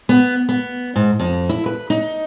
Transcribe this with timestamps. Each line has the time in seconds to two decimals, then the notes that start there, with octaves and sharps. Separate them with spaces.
0.09 B3
0.49 B3
0.96 G#2
1.20 F2
1.49 E4
1.66 B4
1.90 D#4